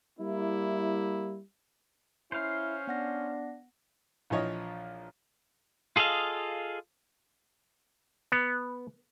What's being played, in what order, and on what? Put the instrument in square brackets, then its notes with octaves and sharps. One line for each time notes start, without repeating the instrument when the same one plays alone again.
[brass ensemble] G3 A#3 E4
[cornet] C#4 [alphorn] E4 [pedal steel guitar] C5 F5
[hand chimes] B3 F#5 A#6 [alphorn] D4
[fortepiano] A#1 E3 F3 C#5 D#5
[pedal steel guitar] F4 G#4 A4 D#5 F5
[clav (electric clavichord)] B3